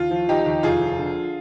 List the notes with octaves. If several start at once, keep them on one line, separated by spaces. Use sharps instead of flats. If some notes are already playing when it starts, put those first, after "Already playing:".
Already playing: D#2 F4
F3
F3 D#4 G4
D#2
F1 F4 G#4
F3
D3